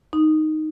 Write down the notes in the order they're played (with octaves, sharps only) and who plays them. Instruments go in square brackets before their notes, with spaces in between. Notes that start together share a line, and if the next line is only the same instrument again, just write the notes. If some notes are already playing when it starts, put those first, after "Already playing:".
[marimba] D#4